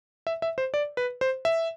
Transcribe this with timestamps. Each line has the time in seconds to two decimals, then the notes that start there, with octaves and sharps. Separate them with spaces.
0.27 E5
0.42 E5
0.58 C5
0.74 D5
0.97 B4
1.21 C5
1.45 E5